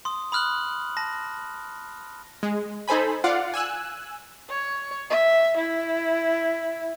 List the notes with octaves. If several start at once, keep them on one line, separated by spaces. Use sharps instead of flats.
C6 D#6
B5 D#6 F6 F#6 F#7
A5 A#6
G#3
D#4 A4 C5 G#5 B5
F4 D5 F5 F#5
G#5 E6 F#6
C#5
E5
E4